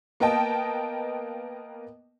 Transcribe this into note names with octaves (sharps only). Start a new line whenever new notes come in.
A#3 B3 A#4 D#5 G5 A5